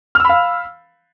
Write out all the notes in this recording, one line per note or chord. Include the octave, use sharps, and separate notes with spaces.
F5 B5 E6 F6